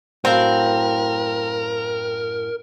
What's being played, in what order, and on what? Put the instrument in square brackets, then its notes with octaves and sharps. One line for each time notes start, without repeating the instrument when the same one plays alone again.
[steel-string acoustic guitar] F#2 A2 F5 [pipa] C4 [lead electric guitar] A#4